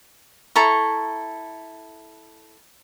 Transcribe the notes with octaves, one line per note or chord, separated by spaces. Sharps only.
E4 A4 A#5 C#6